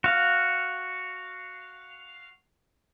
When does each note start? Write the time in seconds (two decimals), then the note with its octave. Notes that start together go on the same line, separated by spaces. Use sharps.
0.04 F#4 F5